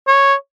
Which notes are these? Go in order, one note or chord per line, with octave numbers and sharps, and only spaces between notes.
C#5